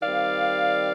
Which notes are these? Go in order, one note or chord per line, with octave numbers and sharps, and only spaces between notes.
D#3 G3 C4 D5 F5